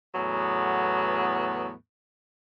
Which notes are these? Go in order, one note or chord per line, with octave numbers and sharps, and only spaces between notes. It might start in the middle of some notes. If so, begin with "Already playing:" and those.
E2 A2 F#3 B3